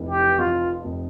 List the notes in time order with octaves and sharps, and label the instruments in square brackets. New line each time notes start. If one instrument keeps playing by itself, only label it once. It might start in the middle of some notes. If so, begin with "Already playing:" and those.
Already playing: [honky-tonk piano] F1 E3
[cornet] G4
[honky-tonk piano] F2 [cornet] F4
[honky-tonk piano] F1